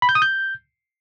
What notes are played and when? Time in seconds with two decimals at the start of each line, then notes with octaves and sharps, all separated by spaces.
0.02 B5
0.09 G6
0.15 D#6
0.22 G6